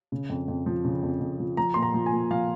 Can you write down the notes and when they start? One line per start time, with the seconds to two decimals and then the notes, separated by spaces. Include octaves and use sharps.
0.12 C#3
0.29 F2
0.48 F2
0.66 F3
0.85 C#3
1.03 F2
1.21 F2
1.39 F3
1.57 F3 A#5
1.74 A#2 C6
1.82 A#5
1.94 F3
2.06 G#5
2.12 A#2
2.31 F3 F5